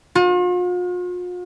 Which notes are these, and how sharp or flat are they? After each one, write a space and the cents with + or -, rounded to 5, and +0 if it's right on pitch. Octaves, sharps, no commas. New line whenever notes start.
F4 +45